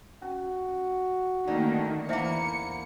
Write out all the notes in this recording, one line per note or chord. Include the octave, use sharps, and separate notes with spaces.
C#4 F#4
D3 D#3 A3 A#3 C#4 D5
E2 A#3 C5 E5 F#5 C#7